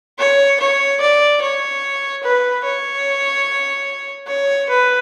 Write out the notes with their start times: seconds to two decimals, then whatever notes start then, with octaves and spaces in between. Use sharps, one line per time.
0.19 C#5
0.60 C#5
1.00 D5
1.42 C#5
2.23 B4
2.64 C#5
4.28 C#5
4.69 B4